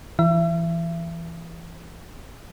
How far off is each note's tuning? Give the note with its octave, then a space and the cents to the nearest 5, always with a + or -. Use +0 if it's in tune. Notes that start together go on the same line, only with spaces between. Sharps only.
E3 +20 E5 +35